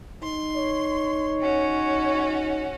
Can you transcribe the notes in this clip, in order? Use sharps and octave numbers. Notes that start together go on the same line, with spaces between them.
D#4 C6
C#5
C#4 F#4